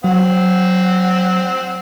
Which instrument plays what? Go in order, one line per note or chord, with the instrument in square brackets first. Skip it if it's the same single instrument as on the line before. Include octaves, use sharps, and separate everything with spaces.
[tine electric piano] F#3 [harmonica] C4 F#5